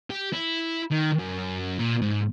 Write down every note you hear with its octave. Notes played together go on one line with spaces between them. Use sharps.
G4
E4
D#3
F#2
A#2
G#2